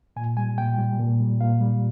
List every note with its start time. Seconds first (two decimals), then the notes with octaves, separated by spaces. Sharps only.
0.16 A#2 G#5
0.37 G3 G#5
0.58 A#2 G5
0.78 G3
0.99 A#2
1.20 G3
1.40 A#2 F5
1.61 G3